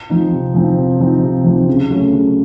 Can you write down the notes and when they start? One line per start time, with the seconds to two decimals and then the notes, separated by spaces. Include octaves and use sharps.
0.10 F3 C4 D#4
0.32 C3
0.54 F3 C4 D#4
0.77 C3
0.99 F3 C4 D#4
1.22 C3
1.44 F3 C4 D#4
1.67 C#3
1.90 F#3 A3 C#4
2.13 C#3